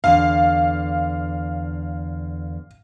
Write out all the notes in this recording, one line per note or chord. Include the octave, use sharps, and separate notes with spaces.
E2 D3 F5